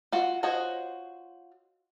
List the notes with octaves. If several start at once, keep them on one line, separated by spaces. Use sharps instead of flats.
F4 F#4
F4 F#4 C5 C#5 D#5